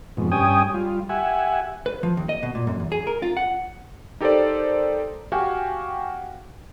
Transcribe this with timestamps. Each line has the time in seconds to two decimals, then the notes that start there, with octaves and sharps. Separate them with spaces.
0.17 F2 G#2 B2
0.32 G2 C#4 G4 G5 G#5 D#6
0.74 G3 F4
1.09 G4 E5 F#5 G#5
1.86 B4
2.03 F3
2.17 D#2
2.29 D#5
2.43 B2
2.55 A#2
2.67 F#2
2.80 E2
2.92 G#4
3.07 A#4
3.22 F4
3.37 F#5
4.20 D#4 G4 A4 A#4 C5 D5
5.32 F#4 G4 F5 G5 G#5